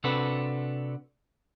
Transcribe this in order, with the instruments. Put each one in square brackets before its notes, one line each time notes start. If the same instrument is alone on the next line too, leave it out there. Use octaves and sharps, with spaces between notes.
[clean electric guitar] C3 C4 D4 F#4 A4 B4